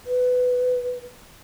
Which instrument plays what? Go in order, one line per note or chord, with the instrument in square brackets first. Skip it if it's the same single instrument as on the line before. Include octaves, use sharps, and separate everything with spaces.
[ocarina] B4